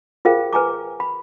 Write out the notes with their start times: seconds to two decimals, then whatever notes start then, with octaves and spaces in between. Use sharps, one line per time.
0.25 F4 G#4 A#4 C5 F5 G5
0.53 B4 G#5 A#5 D6
1.00 B5